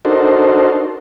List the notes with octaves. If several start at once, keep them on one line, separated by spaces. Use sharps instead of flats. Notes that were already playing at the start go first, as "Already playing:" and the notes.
D4 D#4 F#4 A4 A#4 C5